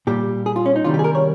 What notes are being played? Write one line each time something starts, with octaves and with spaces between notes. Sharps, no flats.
A#2 G3 G4
G#4
F4
C#4
D#4
C3 D#3 G3 F4
G4
G#4
A#4
C#5